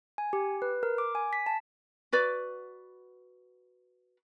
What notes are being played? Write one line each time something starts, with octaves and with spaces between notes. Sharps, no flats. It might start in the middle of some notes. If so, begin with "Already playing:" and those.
G#5
G4
B4
A#4
D6
G#5
B6
A5
F#4 B4 D5